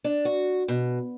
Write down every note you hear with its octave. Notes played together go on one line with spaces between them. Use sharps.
D4
F#4
B2